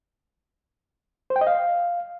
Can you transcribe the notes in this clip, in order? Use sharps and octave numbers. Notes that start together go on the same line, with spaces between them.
C5
G5
D#5
F5